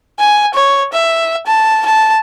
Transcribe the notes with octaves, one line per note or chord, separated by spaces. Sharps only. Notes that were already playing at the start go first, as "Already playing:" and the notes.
G#5
C#5
E5
A5
A5